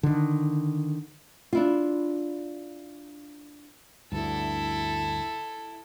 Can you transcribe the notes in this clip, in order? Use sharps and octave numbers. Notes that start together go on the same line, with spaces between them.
D3 D#3
D4 E4 F4
D2 G2 E4 A4